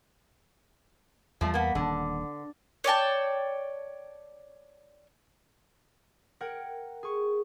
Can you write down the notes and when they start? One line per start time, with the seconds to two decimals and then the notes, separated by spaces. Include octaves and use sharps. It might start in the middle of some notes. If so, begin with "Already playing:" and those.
1.41 E2 F3 G3 A3
1.54 A#3 B3
1.75 D#1 D3
2.84 C#5 D5 G5 A5
6.41 A#4 F#5 G5 G#6
7.03 G#4 C#6